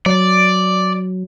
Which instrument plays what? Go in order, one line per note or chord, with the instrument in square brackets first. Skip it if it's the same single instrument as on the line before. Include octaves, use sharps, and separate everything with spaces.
[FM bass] F#3 [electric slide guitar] D5